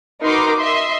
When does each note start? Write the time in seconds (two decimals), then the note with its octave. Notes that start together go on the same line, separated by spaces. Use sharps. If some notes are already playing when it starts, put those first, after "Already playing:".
0.22 D#4 F#4 A#4 B4 C6 D6
0.58 D#5 E5 C6